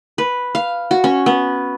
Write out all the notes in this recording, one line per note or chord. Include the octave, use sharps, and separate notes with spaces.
B4
F5
F#4
C#4
B3